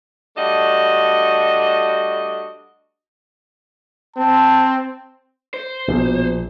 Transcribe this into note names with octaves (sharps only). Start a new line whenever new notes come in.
G3 A3 D4 F#4 D#5
C4 A5
C5
A#1 B2